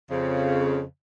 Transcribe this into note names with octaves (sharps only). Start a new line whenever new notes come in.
F2 C#3